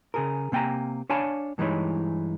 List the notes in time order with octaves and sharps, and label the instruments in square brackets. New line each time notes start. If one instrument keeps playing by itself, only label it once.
[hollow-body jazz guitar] C#3 G#4 A#4
C3 A#3 G5 G#5 A#5
D4 C#5 F5 G#5 A5 B5
G2 E3 G#3 D#4 E4 C#5